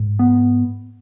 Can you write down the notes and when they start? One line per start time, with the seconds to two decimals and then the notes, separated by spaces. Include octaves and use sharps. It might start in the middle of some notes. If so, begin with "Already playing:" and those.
Already playing: G#2
0.19 B3